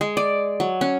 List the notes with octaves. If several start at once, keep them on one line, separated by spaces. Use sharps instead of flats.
G#3
D5
F#3
C#4